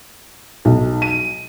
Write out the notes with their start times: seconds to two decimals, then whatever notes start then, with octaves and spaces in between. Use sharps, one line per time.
0.65 B1
1.02 D#7